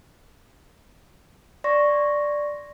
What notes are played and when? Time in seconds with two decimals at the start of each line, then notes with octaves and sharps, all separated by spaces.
1.64 D5 C6 C#6 A#6